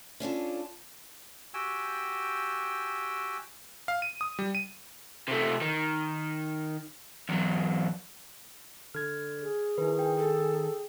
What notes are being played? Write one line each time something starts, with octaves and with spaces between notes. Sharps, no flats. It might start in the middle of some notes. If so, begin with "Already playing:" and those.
C#4 D4 F4 A4
F#4 G4 G5 G#5 E6
F5
D#7
D#6
G3
D#7
C3 A3
D#3
E2 F#3
D3 F6 G#6
G#4
D#3 E4 B4
G5
A4